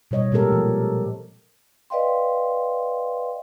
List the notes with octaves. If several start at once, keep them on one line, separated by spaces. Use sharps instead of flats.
B2 G3 C#5 D#5
A#2 G#3 C4 G4 A4 A#4
F3
B4 D5 D#5 F5 G5 C6